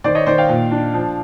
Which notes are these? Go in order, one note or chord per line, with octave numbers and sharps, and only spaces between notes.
D#3 C5 D5
C#5 D#5
D#3 C5 D5
F5 G5
A#2
D4
F3